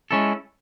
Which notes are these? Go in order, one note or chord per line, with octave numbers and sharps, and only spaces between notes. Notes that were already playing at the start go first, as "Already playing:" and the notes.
G#3 C#4 E4 A4